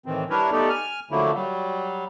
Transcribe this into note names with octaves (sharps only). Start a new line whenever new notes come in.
A2 D#3 E3 C4
G3 D4 E4 A#4 B4 C#5
A3 B3 D#4 G4 A4 D5
G#5 F6
D3 F3 F#3 A3 A#3 E4
F#3 G3